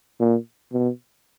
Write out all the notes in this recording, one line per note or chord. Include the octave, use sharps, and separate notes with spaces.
A#2
B2